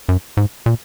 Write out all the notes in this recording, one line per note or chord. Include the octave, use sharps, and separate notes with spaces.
F#2
G#2
A#2